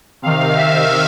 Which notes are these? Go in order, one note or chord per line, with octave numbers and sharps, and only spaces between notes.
C3 D#3 F5
E5